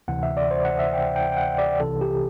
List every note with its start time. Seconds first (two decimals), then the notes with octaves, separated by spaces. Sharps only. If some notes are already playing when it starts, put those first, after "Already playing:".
0.08 D2 C3 E3 F#5
0.23 E5
0.37 D5
0.51 C5
0.65 F#5
0.79 E5
0.94 G5
1.16 G5
1.32 G5
1.37 F#5
1.58 D5
1.79 C2 C3 E3 A4
2.01 G4